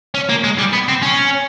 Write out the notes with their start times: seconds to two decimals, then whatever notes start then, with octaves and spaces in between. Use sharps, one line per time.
0.14 C#4
0.29 A#3
0.44 G#3
0.58 G3
0.73 B3
0.88 C4
1.03 C#4